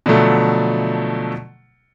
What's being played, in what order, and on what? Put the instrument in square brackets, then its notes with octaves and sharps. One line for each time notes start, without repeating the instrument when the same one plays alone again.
[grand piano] B2 D3 F3 F#3 A3 A4